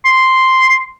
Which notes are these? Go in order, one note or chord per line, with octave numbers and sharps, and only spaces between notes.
C6